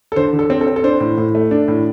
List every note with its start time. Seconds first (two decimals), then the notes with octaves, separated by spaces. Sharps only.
0.12 A4
0.16 D3 C5
0.33 D3
0.39 A4
0.50 C4
0.61 A4
0.67 C4
0.76 A4
0.84 D4 C5
1.00 A2
1.18 A2
1.35 A3
1.51 D4
1.68 A2